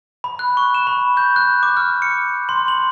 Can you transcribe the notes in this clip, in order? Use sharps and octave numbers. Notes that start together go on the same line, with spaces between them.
B5
F#6
C#6
E7
B5
G6
F#6
D6
F6
C#7
C6
F#7